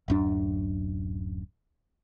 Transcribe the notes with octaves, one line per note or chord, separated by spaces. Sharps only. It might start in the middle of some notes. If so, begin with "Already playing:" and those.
D1 F#2 D4